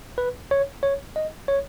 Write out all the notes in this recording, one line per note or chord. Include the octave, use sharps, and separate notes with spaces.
B4
C#5
C#5
D#5
C#5